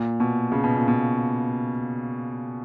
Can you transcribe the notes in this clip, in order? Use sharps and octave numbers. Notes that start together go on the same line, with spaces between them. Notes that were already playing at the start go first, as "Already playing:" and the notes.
Already playing: A#2
B2
C#3
B2
A#2
B2